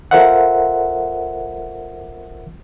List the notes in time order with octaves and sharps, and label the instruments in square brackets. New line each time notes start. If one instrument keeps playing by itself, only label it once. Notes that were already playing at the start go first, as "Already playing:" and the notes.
[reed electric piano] F4 A4 A#4 C5 E5 F#5